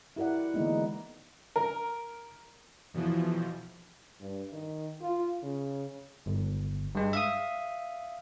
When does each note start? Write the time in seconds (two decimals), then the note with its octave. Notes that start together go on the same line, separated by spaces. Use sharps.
0.16 E4 G4 A#4 D5 F#5
0.54 D3 E3 G#3 A#3 B3 D#4
1.56 A#4
2.94 E2 B2 E3 F3
4.20 G2
4.52 D#3
5.02 F4
5.43 C#3
6.26 G1
6.95 G2 G#3
7.13 E5 F5 D#6